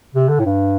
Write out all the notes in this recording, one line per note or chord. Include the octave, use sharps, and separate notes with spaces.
C3
D3
A2
G2